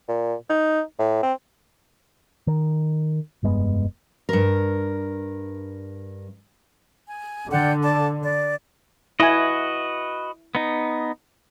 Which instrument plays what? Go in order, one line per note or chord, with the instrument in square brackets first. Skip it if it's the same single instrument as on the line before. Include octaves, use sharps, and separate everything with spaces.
[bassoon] A#2
D#4
A2
C4
[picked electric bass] D#3
F1 G2 G#3 B3
[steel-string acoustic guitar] G2 A#4
[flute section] G#5
[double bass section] D3 [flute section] D5 F#5 G5
[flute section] D5 A5 D6
D5
[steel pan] E4 G#5 [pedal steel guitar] F#4 B4 D#5
[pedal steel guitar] B3 D#4